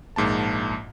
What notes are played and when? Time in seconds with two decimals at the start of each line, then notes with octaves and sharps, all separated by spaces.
0.16 A#1 G#2 A#3 A5